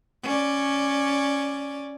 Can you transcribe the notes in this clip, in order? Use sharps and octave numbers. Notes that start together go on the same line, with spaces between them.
C#4 D5